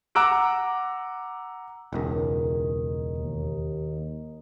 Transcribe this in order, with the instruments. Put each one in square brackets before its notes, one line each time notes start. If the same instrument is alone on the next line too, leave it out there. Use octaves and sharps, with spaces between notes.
[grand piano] F#5 A#5 D6 E6 F#6 D7
[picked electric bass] E1 C#2 [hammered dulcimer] D#3 C#4 D#4
[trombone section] D#2